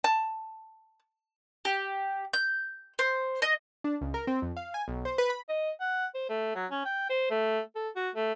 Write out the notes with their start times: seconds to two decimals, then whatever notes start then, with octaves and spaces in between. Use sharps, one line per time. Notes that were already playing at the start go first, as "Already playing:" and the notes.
0.04 A5
1.65 G4
2.33 G6
2.99 C5
3.42 D#5
3.84 D4
4.01 C#2
4.14 A#4
4.27 C4
4.42 F2
4.57 F5
4.74 G#5
4.88 B1
5.05 C5
5.18 B4
5.30 B5
5.49 D#5
5.81 F#5
6.14 C5
6.29 A3
6.55 F#3
6.71 C#4
6.85 G5
7.10 C5
7.30 A3
7.75 A4
7.96 F#4
8.15 A3